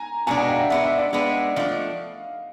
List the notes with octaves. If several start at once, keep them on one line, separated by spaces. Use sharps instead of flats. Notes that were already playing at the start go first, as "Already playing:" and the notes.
Already playing: G#5 A#5
B2 G#3 B3 D4 G#5 A#5
F#5 G#5
F5 G5
E5 F#5
G#3 B3 D4 E5 F#5
E5 F#5
D5 E5
G#3 B3 D4
F3 A3 D4 D#5 F5